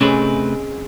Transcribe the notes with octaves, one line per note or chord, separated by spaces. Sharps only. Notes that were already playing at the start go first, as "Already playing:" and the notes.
C3 G#3 A3 C4 C#4 B4